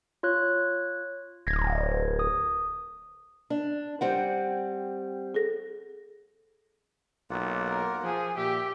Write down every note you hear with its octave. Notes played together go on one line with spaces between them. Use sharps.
F4 C#5 F#6
D1 G#6 A#6
D#6
D4 D5
G3 C4 F#5
G#4 A4 A#6
B1 A#3 F4 F#5
A#4
F3 G#4
A#2 G4 E5